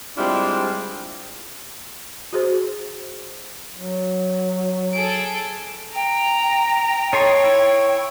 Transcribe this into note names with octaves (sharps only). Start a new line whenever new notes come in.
G3 G#3 C4 D4 E4 F4
F#4 G#4 C5
F#3
G#4 A4 D7
G5 A#5
D#4 A4 C#5 C6
E4